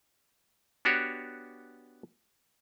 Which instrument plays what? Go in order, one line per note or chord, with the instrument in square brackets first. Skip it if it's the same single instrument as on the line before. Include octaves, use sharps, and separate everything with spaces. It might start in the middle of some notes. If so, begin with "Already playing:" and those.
[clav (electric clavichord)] B3 D4 F#4 G4 C#5